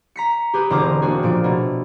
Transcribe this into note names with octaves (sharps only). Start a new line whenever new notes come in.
A#5 B6 C#7
G4 G#4 B4
E1 D3 C4 A#4 A#5 D6
A#3 D4 F#4 G#4
A#2 F3 D7
B2 A3